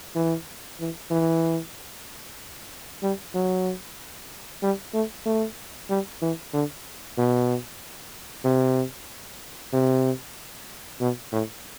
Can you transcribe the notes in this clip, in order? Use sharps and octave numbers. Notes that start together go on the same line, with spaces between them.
E3
E3
E3
G3
F#3
G3
A3
A3
G3
E3
D3
B2
C3
C3
B2
A2